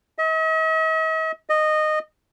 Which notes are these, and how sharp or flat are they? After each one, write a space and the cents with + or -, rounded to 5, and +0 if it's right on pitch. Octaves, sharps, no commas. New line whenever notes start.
D#5 +45
D#5 -15